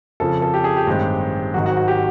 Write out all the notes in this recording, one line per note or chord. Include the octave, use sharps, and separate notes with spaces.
F2 C#3 F3 A4
A4
G4
G#4
G4
A1 G2 D#3 G#3 C4
G#1 G#2 D#3 F#3 F#4
F#4
F#4
G4